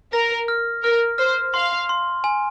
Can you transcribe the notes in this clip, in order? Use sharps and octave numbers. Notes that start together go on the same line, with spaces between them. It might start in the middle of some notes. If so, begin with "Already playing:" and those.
A#4 A#6
F6
A#4 F6
C5 F6
F5 C6
C6
G#5